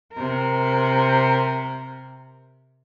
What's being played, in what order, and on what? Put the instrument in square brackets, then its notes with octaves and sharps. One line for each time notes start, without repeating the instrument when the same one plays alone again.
[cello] C3 A#4